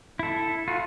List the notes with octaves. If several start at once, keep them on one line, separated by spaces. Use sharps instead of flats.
E4 A4
F4 F#4